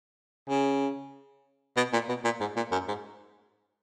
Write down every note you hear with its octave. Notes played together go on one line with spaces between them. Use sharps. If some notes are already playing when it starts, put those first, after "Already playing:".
C#3
B2
A#2
B2
A#2
G#2
A#2
F#2
G#2